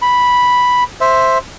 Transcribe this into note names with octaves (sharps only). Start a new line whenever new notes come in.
B5
C5 E5